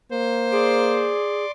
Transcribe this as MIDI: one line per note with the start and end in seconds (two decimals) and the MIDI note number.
0.11 1.15 58
0.11 1.24 72
0.52 1.45 68
0.52 1.51 74
0.52 1.51 84
0.52 1.51 86